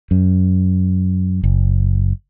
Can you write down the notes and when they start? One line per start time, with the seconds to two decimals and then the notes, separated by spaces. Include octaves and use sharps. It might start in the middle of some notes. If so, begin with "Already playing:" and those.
0.11 F#2
1.43 F#1